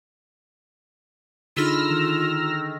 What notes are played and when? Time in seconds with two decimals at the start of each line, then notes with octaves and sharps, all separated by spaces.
1.57 D3 D#4 F4 G#4 B5 E6 F6 A#6
1.91 D#3